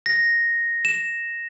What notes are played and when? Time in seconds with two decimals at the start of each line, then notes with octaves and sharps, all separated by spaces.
0.06 A#6
0.85 E7